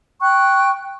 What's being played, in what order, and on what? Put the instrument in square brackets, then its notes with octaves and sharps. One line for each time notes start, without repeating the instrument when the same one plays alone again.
[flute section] G5 C#6 F#6